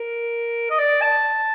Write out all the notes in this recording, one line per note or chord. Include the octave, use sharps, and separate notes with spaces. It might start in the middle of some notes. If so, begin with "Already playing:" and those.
Already playing: A#4
D#5
D5
A5